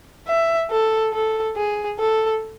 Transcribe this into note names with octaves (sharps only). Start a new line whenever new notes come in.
E5
A4
A4
G#4
A4